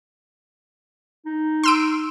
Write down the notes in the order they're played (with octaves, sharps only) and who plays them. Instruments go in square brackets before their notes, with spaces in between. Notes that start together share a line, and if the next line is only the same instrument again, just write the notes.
[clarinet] D#4
[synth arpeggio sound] C6 E6 D7